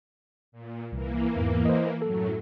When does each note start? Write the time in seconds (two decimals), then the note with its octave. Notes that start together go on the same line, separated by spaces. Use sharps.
0.52 A#2
0.92 C2 E3 A#3
1.36 E2 G#2
1.65 C5 D#5
2.02 F#2 A2 F#3 A4